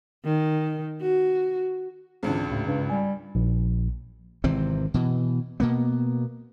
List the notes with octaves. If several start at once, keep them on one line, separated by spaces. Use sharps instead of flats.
D#3
F#4
G#1 C#2 D3 E3 C4 D4
D2 A2 C#3
G2 C#3
G3 G#5
A#1
G#1 C3 E3 C4
B2 E3
B2 A#3 B3